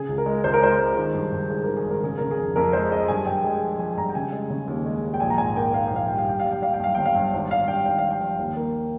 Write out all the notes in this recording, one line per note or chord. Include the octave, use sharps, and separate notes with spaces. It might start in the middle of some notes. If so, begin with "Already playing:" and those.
Already playing: C#3 G#4
C#2
A#4
G#3
C#2 C5
A#4
G#3 C5
G#3
D#3
G2
G2
G#1 G#4
D#3 A#4
G#4
G#1
A#4
C#3 G#4
C#3 A#4
G#4
F2
F2 A#4
G#3 C5
G#3 D#5
G2 G#5
G2 G5
G#3 G#5
F3
F3 G#5
G2 A#5
G5
C#3 G#5
G#3
C#3
D#2
G#3
D#2
G5
A#1 G#5
A#5
G#2 G#5
A#3 G5
A#3 F5
G5
A#1
F5
G3 G5
F5
G2 G5
G3 F5
G5
G3 F5
G5
G2 F5
G1 G5
F5
G2
G#1
G#1 F5
G2 G5
G#1 G5
G2 F5
G5
F3
D#2
A#3